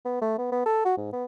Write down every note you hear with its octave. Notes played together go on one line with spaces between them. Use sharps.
B3
A3
B3
B3
A4
F#4
G#2
B3